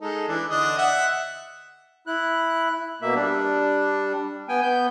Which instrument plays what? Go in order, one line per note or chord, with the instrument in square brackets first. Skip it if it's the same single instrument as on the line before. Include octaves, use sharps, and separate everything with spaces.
[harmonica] G#3 D#4 A4
E3 D4
D3 D4 D#5
E5 F#5
[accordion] E4 F#6
B2 A#3 E5
G3 D4
B3 G5 G#5
B3 G6